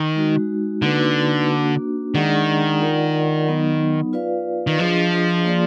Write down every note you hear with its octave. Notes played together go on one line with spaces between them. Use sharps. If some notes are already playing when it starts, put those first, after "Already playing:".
Already playing: D#3
G#3 D#4 F#4
D3 A#3 D#4 F#4 B4
A#3 D4 F#4
D#3 G#3 D4 G#4 D5 F#5
F4 A#4 D5 F#5
F#3 B3 D#4
F4 B4 D5 F5
D#3
F3 D4 F4 G#4 D#5
A#3 F4 G#4 D5